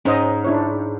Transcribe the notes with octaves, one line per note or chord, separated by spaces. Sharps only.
G#2 C#4 C5 D#5
D4 E4 C#5